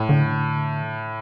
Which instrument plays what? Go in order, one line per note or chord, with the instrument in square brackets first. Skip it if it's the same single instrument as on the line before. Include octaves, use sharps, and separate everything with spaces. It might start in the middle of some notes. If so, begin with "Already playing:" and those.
Already playing: [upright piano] A2
[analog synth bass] D3